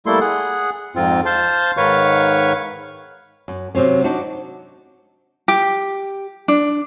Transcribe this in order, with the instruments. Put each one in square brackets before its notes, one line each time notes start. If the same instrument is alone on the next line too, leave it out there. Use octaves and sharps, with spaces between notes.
[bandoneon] G3 A3 A#3 E4 A4 C6
G#4 F#5
F2 G#2 C4 F4
C5 F5 A5 C6
G#2 D#3 B4 C#5 F5 C#6
[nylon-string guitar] F#2
C3 F#3 C4 C#4
D4 D#4 F#4
[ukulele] G4
D4